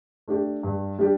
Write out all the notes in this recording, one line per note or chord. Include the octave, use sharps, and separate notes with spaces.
A3 D4 G4
G2
G3 D4 G4